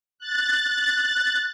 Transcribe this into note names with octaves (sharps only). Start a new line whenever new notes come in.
F#6 A6